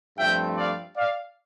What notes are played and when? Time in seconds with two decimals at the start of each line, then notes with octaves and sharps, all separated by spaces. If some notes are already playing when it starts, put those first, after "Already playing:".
0.18 G2 F3 A3 C4 E5 G5
0.57 D5 F5
0.96 D5 F5